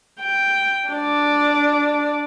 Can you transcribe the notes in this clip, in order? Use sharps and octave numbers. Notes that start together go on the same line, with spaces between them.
G5
D4 D5